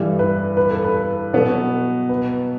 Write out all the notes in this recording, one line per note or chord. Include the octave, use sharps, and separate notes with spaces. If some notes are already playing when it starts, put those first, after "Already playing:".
Already playing: G2 E3 G3 A4
B4
B4
A4
B4
B2 F#3 B3 F#4
B4